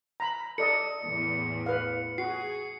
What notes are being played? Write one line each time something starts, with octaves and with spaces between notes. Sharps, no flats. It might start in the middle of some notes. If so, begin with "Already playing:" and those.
A#5 B5
A4 D5 D#5 C#7
E2 A2
B4 F5
F#4 G#4 C7